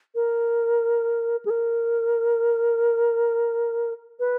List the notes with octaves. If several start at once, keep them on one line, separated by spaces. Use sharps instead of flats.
A#4
G#4
A#4
B4